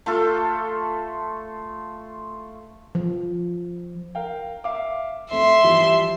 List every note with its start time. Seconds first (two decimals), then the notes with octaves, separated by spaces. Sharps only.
0.06 A3 F4 A4
2.95 F3
4.15 A#4 F5 G5
4.64 E5 F5 D6
5.31 F2 A3 E5 C6
5.63 E3 F3 G3